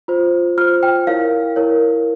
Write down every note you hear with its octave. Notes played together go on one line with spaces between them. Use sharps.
F4 C5
F4 C5 F6
G5
E4 A#4 C#5 F5
E4 A#4 C#5